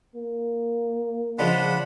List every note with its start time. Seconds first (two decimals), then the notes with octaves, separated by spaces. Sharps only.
0.15 A#3
1.39 C#3 F3 G#3 D4 F#5 B5